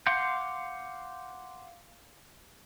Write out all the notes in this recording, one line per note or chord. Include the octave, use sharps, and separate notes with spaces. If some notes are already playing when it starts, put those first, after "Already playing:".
F5 F#5 C6 D6 G6